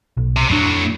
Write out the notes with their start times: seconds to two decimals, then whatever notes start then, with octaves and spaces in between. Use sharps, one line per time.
0.17 B1
0.37 C3
0.49 F2 A2 F#3 D4